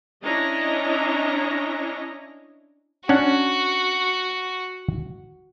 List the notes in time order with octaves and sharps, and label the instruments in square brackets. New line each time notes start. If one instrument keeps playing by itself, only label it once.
[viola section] C#4 D4 E4 C#5 D#5 A#5
[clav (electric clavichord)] C#4 D4 F#5 [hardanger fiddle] F#4